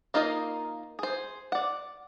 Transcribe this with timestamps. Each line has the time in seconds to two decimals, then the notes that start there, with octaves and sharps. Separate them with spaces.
0.14 A#3 D#4 F4 A#4 D#5
0.99 G#4 C5
1.52 D5 F#5